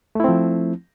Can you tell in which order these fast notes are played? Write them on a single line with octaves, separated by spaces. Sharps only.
A3 E4 C4 F3